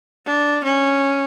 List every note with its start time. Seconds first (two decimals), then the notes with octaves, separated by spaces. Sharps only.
0.26 D4
0.65 C#4